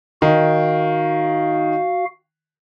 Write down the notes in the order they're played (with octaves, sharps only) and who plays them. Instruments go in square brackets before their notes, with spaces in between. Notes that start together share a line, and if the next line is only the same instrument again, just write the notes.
[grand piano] D#3 [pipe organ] F#4 F5